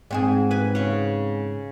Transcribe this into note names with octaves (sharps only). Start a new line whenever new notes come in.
G#2 C4 G#4
B4 G#5
C#3 C#6